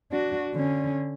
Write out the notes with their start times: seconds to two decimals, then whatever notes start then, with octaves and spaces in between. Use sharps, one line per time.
0.12 D4 F#4
0.54 D3 C#4